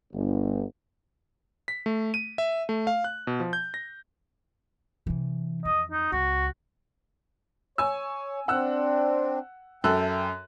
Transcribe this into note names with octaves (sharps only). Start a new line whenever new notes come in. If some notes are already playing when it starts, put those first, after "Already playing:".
G1
B6
A3
D#7
E5
A3
F5
F#6
B2
F3
G6
A#6
C3 E3
F2 D#5
D#4
C#2 F#4
C#5 G#5 E6
C4 D4 F#5 E6 F#6
F#2 A4 E5 G5 F#6